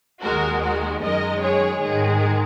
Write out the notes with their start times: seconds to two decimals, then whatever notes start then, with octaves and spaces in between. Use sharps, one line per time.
0.23 D#2 D#3 G#3 F#4 A#4
0.63 F#4 A#4
1.02 F#2 D#3 G#3 A#4 D#5
1.42 G#4 C#5
1.82 G#2 D#3 G#3 G#4